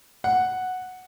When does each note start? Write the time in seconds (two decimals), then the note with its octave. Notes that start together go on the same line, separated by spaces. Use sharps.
0.24 F#5